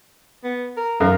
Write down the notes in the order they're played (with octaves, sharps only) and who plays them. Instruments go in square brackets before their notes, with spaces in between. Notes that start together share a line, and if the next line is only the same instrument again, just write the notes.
[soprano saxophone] B3
A#4
[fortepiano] F#2 A#4 [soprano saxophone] F5